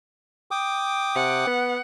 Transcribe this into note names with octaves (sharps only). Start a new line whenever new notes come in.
G5 D6 D#6
C3 F#5
B3